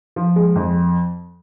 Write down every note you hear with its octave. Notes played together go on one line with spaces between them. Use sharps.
F3
G#3
F2